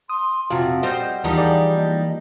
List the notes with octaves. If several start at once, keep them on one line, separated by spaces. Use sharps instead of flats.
C6 D#6
F2 C3 F4 F#4 F5 F#5
G3 C5 D#5
D#2 E3 F3 G3 D#4 G4 A#4
G#4 D5
A#3 D#5